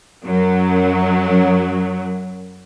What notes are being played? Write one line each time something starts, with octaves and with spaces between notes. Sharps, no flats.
F#2 F#3